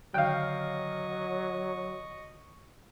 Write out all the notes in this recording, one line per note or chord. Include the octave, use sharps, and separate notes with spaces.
D3 D#3 F#3 D#5 F5 G5 C#6